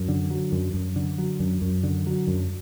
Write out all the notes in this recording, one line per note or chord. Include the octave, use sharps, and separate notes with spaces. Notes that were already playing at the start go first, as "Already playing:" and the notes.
Already playing: F#2
D3
F#3
F#2
F#2
D3
F#3
F#2
F#2
D3
F#3
F#2